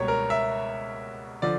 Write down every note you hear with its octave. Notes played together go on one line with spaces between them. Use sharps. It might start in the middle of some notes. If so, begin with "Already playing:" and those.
Already playing: C#2 B2 G3 A#3 C#5
A#4
E5
D3 F3 D5